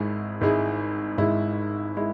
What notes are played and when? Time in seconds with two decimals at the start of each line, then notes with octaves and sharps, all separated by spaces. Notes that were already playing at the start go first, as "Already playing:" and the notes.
Already playing: G#1 G#2 G#3 E4 G#4
0.41 G#1 G#2 G#3 E4 G#4
1.17 G#1 G#2 G#3 E4 G#4
1.97 G#3 E4